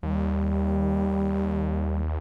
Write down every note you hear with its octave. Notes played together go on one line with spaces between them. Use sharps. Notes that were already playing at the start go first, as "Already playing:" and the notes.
D#2 G3